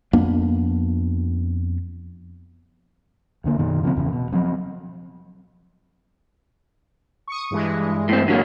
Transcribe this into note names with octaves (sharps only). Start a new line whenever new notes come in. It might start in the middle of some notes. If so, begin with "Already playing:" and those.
F2 A#3 B3 D4
D#2 D3 A#3
F#2 B2 D#3 F#3
C#3 F3 G3 C4
D#1 E2 C#3
B2
F3 F#3 C4
C#6 D#6
G2 E3 G#3
A2 C4
D3 F#3 A#3